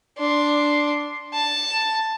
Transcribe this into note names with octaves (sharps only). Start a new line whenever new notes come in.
D4 C6
A5